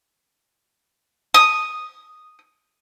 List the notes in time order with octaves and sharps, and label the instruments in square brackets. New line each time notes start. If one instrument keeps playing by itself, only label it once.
[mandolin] D#6